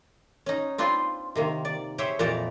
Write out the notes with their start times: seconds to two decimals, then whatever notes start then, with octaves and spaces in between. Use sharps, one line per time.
0.46 C#4 D#4
0.78 C4 D4 F4 B4 C6
1.35 C3 D#3 A#3
1.65 D5
1.98 G4 G#4 C5 C#5 E5 G5
2.19 F2 A#2 E3 G4 A#4 D5